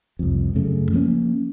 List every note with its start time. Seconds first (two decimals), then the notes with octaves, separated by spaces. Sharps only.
0.19 C2 F2
0.55 F#2 C#3 A3
0.92 F3 A#3 B3 C#4